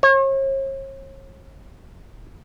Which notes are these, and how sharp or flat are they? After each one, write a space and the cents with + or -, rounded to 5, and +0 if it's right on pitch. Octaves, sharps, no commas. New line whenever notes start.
C#5 -40